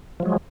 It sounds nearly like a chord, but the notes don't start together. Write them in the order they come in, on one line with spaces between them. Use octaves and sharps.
F3 F#3 G#3